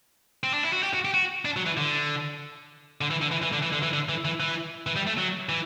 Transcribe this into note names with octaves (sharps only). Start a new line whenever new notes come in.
C4
D4
E4
F#4
G4
F#4
G4
F#4
D4
F#3
E3
D3
D3
E3
D3
E3
E3
D3
E3
D3
E3
D3
E3
E3
E3
E3
G3
A3
F#3
E3